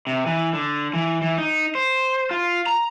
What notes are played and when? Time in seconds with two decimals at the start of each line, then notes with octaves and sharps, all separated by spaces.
0.07 C3
0.26 E3
0.53 D3
0.93 E3
1.22 E3
1.38 D#4
1.75 C5
2.31 F4
2.66 A#5